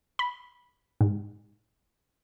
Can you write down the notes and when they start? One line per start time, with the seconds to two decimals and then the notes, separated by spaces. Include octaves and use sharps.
0.19 B5
1.01 G#2